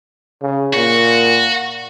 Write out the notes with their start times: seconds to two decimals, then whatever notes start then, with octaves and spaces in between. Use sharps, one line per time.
0.42 C#3
0.73 A#2 F#4